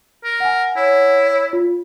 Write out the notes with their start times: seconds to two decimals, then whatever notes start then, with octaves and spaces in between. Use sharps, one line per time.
0.24 A#4
0.40 F#5 G#5
0.77 E4 C#5
1.53 F4